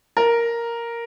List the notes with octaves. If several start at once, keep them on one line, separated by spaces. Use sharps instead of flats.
A#4